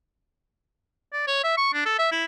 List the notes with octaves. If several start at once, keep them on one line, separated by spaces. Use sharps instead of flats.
D5
C#5
E5
C#6
D4
A4
E5
E4